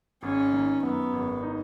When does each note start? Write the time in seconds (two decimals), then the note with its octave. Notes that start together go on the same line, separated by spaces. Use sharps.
0.23 G#1 C#4
0.53 D#3
0.83 F#2 B3
1.13 G#1
1.43 D#4